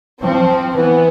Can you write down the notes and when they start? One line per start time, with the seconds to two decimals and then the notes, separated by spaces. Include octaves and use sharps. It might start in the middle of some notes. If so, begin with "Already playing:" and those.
0.22 F3 C4
0.75 E3 B3